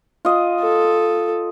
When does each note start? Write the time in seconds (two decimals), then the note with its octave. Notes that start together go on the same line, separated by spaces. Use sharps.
0.25 F4 D#5
0.61 A4